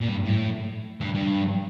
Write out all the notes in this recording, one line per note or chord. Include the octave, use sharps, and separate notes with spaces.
A#2
G2
A2
G2
G2